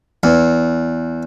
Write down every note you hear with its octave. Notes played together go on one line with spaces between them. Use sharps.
E2